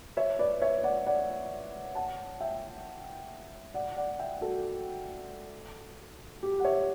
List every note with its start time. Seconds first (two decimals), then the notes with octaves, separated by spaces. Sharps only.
0.17 C#5 E5
0.39 B4 D5
0.61 C#5 E5
0.84 D5 F#5
1.06 D5 F#5
1.95 F#5 A5
2.40 E5 G5
3.74 D5 F#5
3.97 D5 F#5
4.19 E5 G5
4.41 F#4 A4
6.43 G4
6.60 F#5
6.65 C#5 E5